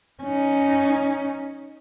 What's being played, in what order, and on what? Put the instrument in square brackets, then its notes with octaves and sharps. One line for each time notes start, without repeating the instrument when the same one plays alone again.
[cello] C#4 D#4